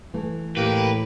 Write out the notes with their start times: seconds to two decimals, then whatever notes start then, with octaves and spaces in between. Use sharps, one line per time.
0.14 E3 A3
0.57 A2 A#3 G4 B4